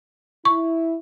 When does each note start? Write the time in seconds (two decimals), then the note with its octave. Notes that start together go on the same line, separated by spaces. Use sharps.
0.45 E4 C#6